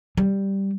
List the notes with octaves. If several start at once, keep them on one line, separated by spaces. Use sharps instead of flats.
G3